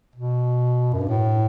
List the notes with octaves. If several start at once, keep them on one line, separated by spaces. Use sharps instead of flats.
B2
F#2
G2
A2